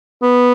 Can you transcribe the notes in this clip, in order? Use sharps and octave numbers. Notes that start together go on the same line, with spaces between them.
B3